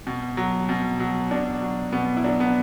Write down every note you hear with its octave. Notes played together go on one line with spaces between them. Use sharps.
B2
F#3
B2
F#3
B2 D4
F#3
B2 B3
E4
F#3 D4
B3